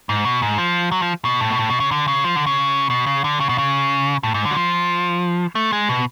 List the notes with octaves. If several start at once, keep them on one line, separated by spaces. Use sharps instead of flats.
G#2
B2
G#2
F3
F#3
F3
B2
A2
B2
A2
B2
C#3
D3
C#3
F3
D3
C#3
B2
C#3
D3
C#3
B2
C#3
A2
G#2
D3
F#3
F3
A3
G#3
B2